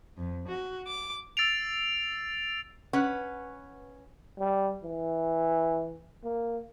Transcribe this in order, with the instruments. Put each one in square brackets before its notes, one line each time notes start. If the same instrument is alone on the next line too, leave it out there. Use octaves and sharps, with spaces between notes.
[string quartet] F2
F#4
D6
[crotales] E6 A6 C7 D7 F7
[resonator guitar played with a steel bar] C#4 B4 F#5
[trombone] G3
E3
A#3